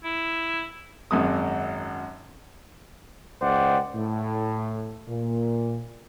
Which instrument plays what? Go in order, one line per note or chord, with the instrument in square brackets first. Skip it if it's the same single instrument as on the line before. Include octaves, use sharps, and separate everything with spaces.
[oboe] E4
[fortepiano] G#1 F#2 D#6
[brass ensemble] C#2 C5 D5 D#5 F#5 G5
A2
A#2